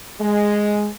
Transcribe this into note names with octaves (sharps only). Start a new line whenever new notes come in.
G#3